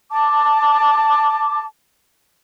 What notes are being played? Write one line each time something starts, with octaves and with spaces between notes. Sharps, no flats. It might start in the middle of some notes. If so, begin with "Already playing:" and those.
A5 D6